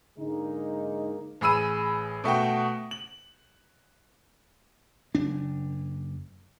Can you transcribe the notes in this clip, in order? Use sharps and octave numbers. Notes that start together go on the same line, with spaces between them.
G#2 D3 G#3 A#3 D#4
A1 G#4 B5 E6 D#7
B2 A3 F#4 G5
F#7
F#1 D4